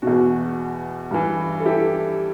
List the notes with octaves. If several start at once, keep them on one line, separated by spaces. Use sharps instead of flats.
E2 B2 F#4
G2 E3
A4
E4 G4